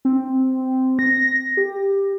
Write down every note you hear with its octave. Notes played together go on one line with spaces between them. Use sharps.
C4
A#6
G4